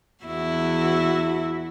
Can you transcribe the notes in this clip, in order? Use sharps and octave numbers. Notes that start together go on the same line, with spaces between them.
E2 E4 F#4